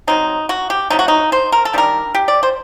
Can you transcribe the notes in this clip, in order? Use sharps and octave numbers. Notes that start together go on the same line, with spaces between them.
C3 F#3 C4 D#4
F#4
G4
C3 F#3 A3 D#4
F#4
D#4
C5
A#4
A4
D#3 G3 D4 A#4
G4
D5
C5